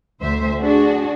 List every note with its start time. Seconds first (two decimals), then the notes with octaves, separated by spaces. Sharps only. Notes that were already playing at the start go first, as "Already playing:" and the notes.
0.22 D2 C5 E5
0.60 D4 F#4 G#4